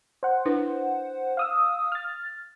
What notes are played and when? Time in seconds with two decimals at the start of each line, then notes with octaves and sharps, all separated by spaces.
0.23 C5 F#5
0.45 D4 E4 B4
1.37 F5 D#6 E6
1.92 F6 A6